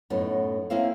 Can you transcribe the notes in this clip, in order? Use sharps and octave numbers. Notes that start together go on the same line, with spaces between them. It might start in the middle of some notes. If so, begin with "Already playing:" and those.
F#2 A2 B3 D#4
A#3 C4 C#4 E4 F5